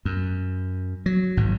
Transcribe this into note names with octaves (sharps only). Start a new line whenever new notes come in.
F#2
F#3
G#1 G#2